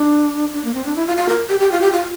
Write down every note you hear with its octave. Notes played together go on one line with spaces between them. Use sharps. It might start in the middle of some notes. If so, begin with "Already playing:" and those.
Already playing: D4
D4
A#3
C4
D4
E4
F4
F4
A#4
G4
G4
F4
G4
F4